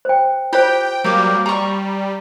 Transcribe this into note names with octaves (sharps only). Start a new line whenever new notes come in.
C5 G5
F4 G4 C5 G5
F#3 G3 A#3 G4 D6
G3 A#5 C#6